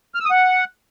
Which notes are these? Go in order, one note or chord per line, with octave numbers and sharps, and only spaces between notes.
F6
E6
D#6
F#5